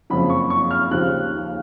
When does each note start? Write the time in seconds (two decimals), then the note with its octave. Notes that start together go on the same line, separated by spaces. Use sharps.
0.10 F#1 F2 C#3 F3 B5
0.30 C#6
0.50 C#6
0.71 F6
0.91 D#2 C#3 F3 F#6